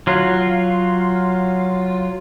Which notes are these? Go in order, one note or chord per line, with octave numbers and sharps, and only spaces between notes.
F#3 F4